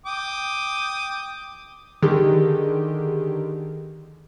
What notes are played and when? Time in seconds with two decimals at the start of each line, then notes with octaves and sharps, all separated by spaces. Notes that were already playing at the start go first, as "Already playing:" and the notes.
0.06 G5 D6 D#6
2.02 D3 D#3 G4 G#4